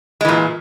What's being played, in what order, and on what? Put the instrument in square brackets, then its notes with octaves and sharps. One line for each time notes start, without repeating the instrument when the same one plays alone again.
[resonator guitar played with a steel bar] G#3
E3
A#2